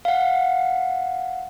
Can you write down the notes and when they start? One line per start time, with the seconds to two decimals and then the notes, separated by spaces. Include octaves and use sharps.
0.05 F5 F#5